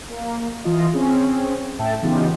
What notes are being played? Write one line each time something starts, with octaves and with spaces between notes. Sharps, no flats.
A#3
E3 F4 D#5
C4 C#4 G#4
A2 E5 G5 A5
C#3 E3 B3 D#4 F4 G4